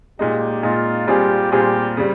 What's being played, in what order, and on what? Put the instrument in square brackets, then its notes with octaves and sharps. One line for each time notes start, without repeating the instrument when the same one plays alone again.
[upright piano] A#2 G#3 D#4 [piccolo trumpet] G4
[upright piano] A#2 G#3 D#4 [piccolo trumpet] F4
[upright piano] A#2 G3 C4 F4 G#4 [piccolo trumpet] G4
[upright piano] A#2 G3 C4 F4 G#4 [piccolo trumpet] G4
[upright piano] C#3 G3